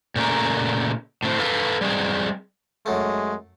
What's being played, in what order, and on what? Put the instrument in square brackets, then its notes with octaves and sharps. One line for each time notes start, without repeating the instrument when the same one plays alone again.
[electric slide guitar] A#2 C#3 A3 A#3 A#4
A2 C4
A4 B4 F5
G3 G#3 C4 G#4
[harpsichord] F#2 A3 [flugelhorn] G#3